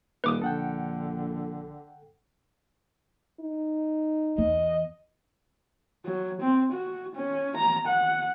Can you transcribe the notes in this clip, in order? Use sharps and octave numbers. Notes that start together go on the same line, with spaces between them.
D#1 B4 D6 D#6
A#1 D3 A4 F#5 G5
D#4
E2 D#5
F#3
C4
F#4
C#4
A#5
F#5